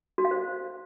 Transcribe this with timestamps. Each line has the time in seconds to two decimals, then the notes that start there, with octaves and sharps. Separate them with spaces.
0.18 F#4
0.25 F5
0.31 C5